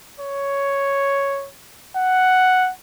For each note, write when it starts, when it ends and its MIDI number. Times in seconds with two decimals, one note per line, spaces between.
0.20 1.48 73
1.97 2.71 78